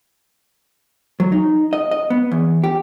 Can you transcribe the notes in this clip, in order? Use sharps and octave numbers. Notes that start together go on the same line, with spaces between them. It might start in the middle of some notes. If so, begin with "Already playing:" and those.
F#3
D#4
D#5
D#5
B3
E2
G4